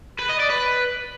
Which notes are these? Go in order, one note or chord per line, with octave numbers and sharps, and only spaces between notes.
B4
D#5
D5
B4